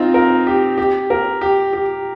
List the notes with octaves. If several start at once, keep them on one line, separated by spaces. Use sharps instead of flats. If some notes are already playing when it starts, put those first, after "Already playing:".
Already playing: C4 D#4 F4
A#4
G4
G4
A#4
G4
G4